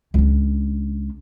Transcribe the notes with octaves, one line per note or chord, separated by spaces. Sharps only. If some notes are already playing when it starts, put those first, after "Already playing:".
C#2 D4